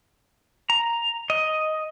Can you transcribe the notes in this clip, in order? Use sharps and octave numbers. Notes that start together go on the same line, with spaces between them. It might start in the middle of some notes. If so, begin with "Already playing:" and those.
A#5
D#5